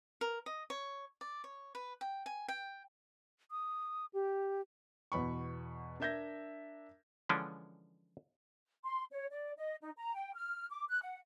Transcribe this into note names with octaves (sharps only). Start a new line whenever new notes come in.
A#4
D#5
C#5
D5
C#5
B4
G5
G#5
G5
D#6
G4
E2 B2 B5 C#6
D4 A#4 E5 G6 G#6 A#6
D3 E3 F3 G#3 C#4 D4
C6
C#5
D5
D#5
D#4
A#5
G5
F6
D6
F#6
F#5